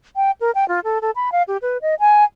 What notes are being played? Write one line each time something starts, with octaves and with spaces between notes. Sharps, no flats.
G5
A#4
G5
F4
A4
A4
B5
F5
G4
B4
D#5
G#5